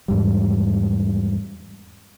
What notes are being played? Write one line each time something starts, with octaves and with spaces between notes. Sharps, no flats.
E2 G#2 G3